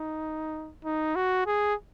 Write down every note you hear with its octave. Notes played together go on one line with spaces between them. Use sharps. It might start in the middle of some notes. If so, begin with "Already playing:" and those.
Already playing: D#4
D#4
F#4
G#4